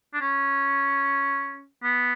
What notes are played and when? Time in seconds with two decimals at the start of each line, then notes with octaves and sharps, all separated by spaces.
0.13 D4
0.21 C#4
1.83 B3